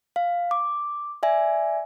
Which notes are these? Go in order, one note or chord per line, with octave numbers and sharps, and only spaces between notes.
F5
D6
D5 E5 G#5